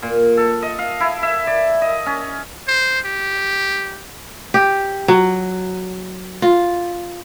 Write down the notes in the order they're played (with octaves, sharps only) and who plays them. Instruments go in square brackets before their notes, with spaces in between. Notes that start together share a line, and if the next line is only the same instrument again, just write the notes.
[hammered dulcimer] A#2
A4
D#5
F5
E4
E5
D5
D#5
C#4
[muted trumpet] C5
G4
[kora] G4
F#3
F4